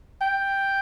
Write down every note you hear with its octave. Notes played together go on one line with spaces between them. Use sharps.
G5